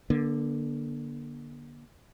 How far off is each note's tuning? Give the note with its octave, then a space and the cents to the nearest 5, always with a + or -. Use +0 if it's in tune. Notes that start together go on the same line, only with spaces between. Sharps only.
D3 +0 A#3 +40